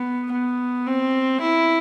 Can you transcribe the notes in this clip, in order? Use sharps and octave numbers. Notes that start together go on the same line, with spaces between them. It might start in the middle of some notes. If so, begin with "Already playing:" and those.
Already playing: B3
B3
C4
E4